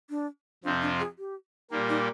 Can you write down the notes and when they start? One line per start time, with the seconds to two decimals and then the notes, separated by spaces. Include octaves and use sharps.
0.10 D4
0.64 F2 C3 F3 C4 D4 F4
0.82 D4
0.99 G#4
1.18 G4
1.71 A#2 G3 A#3 D#4
1.89 D#4